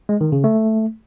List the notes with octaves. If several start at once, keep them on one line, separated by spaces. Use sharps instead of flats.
G#3
D#3
C#3
A3